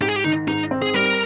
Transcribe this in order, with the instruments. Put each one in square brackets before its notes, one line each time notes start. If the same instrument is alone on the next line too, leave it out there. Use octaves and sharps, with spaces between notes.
[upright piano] G#2 [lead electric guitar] G4
[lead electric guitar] G#4
G4
[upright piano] D#3 [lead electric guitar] D#4
[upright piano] G#2 [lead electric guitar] D#4
[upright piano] C4
[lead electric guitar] G#4
[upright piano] G3 [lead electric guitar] A#4